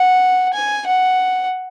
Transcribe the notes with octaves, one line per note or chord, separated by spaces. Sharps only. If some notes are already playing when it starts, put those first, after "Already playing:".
Already playing: F#5
G#5
F#5